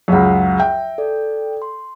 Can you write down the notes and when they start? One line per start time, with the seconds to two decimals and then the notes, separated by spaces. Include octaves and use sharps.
0.08 C#2 F#2 G#4 F5 F#5
0.60 E5 G5
0.98 A4 D5
1.62 C6